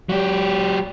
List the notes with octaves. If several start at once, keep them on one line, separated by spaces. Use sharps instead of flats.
F#3 G4